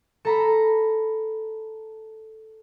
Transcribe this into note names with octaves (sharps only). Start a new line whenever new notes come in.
A4 A#5 B5